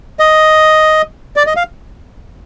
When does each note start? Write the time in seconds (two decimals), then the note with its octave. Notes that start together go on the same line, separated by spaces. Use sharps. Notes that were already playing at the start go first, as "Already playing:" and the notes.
0.19 D#5
1.36 D5
1.47 D#5
1.56 F5